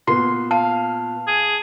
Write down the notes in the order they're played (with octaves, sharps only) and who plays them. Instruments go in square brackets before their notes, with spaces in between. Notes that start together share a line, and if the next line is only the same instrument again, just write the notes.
[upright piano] A#2 B3 [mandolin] C6
[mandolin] F5 [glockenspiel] A5
[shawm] G#4